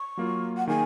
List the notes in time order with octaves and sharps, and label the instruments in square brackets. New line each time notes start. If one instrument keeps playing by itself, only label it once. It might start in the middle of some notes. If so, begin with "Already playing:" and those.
Already playing: [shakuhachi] C#6
[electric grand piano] F#3 A#3 F4
[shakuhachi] F#5
[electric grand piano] D#3 A#3 D#4 G#4 [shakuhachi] G#5